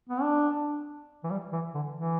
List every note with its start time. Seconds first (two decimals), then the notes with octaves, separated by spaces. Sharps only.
0.09 B3
0.22 D4
1.24 E3
1.30 G3
1.52 E3
1.74 D3
1.96 E3